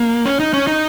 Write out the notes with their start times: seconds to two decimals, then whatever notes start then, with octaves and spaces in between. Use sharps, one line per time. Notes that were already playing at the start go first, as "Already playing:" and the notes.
Already playing: A#3
0.26 C#4
0.40 D#4
0.53 C#4
0.67 D#4